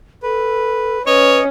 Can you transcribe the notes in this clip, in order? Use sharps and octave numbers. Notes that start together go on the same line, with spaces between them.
A4 B4
C#4 B4 C#5 D#5